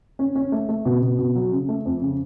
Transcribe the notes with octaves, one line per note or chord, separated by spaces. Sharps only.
C#4
C#4
A3
A3
B2
B2
B2
F#3
C#3
A3
F2
C#3